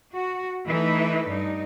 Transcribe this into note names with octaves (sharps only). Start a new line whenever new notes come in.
F#4
E3 A3 D#4 A4 B4
G2 D#4